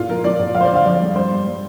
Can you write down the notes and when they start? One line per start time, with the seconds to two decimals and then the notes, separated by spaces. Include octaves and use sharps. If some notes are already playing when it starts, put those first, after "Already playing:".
Already playing: A#2 F4
0.09 F3 A#4
0.24 F3 D5
0.40 A#2
0.54 F2 F5
0.61 C5
0.65 D5
0.70 D3 F5
0.85 F2 D5
1.00 G3
1.16 G2 C5
1.31 G3
1.46 G3